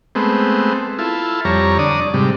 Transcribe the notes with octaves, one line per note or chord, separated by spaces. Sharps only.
G#3 A3 B3 C4
E4 F4 A4
F2 G3 C#5 A#5
D3 D5 D#6
G#2 C3 G3